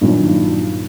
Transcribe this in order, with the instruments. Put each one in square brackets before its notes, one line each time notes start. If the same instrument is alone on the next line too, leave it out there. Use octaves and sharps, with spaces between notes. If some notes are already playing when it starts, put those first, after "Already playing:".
[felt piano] G2 A#2 D#3 F#3 F4